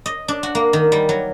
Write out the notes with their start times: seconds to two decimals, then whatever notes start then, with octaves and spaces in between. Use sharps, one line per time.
0.06 D#5
0.28 D4
0.43 F#4
0.55 A#3
0.73 D#3
0.92 G3
1.09 F#3